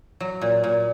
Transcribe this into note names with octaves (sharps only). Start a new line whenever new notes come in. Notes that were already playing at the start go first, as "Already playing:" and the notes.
F#3
A#2
A#2